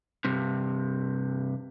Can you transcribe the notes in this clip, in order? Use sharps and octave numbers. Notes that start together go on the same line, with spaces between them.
G2 C3